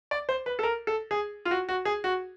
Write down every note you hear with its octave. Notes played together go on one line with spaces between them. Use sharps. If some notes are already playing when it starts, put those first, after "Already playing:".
D5
C5
B4
A4
A#4
A4
G#4
F4
F#4
F#4
G#4
F#4